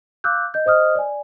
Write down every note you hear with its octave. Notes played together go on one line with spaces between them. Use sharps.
F5 D6 E6 F#6 G6
D#5 G6
C5 D#5 D#6 F6
D5 G#5